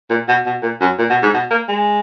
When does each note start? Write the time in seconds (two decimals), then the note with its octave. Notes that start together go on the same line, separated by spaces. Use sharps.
0.10 A#2
0.29 B2
0.46 B2
0.63 A#2
0.81 F#2
0.99 A#2
1.10 B2
1.22 G#2
1.34 B2
1.51 A#3
1.68 G#3